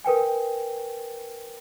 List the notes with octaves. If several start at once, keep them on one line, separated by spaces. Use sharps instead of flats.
A#4 B4 G5 G#5